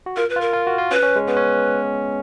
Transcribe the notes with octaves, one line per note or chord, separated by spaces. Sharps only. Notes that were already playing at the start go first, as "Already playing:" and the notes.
F#4
F4 A#4
B4
F4
A#4
F4
F#4
F4
C#4 B4
C#4
G#3
B3 B4
C#4